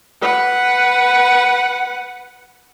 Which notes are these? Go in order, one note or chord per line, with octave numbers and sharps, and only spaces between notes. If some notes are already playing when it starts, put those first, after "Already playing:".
B4 F#5